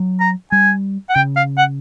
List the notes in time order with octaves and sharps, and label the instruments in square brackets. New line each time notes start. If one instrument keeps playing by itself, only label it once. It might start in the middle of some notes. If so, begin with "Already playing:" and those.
Already playing: [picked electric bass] F#3
[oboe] A#5
[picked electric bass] G3 [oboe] G#5
[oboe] F#5
[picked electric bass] C#3 [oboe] G5
[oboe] F5
F#5